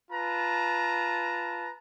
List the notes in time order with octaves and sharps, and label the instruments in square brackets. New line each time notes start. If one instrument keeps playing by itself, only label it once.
[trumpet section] F4 B4 A5 A#5